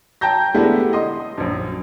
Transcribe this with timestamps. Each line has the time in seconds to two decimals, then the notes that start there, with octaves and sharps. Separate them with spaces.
0.21 G5 A5 A#5 G6 A#6
0.54 G#3 A3 B3 D4 E4 G4
0.93 D#5 C6 D#6
1.38 A#1 F#2